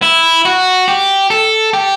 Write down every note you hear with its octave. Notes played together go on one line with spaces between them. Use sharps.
E4
F#4
G4
A4
G4